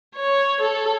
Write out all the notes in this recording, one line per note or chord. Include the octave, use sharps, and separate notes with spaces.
C#5
A4